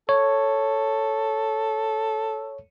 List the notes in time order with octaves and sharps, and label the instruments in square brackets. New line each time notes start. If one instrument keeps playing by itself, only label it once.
[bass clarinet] A4 [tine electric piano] C#5